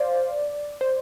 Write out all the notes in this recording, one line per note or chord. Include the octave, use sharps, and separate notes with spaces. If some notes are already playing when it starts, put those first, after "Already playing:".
Already playing: C5 D5 F5
C5